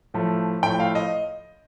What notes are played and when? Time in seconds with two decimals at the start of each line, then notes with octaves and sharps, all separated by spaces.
0.14 A2 F3 A3
0.63 A2 F3 A3 G5
0.80 F5
0.95 D#5